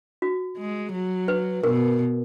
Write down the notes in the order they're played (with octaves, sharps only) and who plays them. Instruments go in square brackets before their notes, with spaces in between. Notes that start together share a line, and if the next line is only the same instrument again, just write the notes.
[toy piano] F#4
[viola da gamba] G#3
F#3
[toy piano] B4
[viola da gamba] B2 [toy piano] A#4